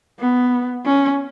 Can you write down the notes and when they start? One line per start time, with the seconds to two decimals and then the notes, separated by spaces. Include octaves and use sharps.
0.20 B3
0.86 C#4